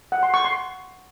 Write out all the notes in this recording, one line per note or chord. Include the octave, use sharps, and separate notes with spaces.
F#5
C6
C#6
C6